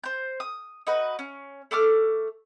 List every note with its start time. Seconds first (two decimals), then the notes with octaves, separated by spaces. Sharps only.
0.04 C5 G6
0.40 D#6
0.87 D#4 F#4 B4
1.19 C#4
1.71 A3 A4 D6 F6